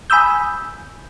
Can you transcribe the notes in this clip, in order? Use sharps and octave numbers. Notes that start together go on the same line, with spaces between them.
G#5 B5 D#6 E6 G6